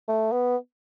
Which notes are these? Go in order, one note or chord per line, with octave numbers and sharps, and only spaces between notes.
A3
B3